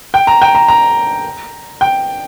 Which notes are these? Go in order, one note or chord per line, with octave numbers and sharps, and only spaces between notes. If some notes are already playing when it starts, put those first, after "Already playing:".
G5
A#5
G5
A#5
A#5
G5